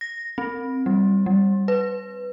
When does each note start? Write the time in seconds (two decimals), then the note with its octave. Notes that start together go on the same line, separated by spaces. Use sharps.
0.01 A#6
0.38 C4
0.86 G3
1.26 G3
1.68 B4